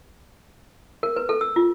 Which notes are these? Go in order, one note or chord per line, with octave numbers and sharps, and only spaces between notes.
A#4
B4
A4
E6
F4